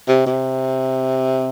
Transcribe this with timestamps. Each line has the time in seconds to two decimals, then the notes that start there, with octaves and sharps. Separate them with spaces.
0.08 C3
0.26 C3